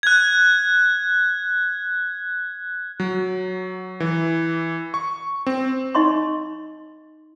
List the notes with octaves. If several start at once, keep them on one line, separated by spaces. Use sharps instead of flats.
F#6 G#6
F#3
E3
C#6
C4
D#4 D#5 C6 C#6